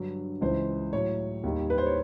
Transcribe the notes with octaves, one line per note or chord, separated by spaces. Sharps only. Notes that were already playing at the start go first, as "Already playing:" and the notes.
Already playing: G2 D3 F#3
C#2 C#3 E3 C5
A2 F#3 C#5
D#2 D#3 G3
B4
C5
C#5